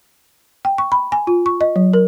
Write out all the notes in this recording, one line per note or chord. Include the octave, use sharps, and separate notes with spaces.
G5
C#6
B5
G#5
F4
C#6
D#5
F#3
A#4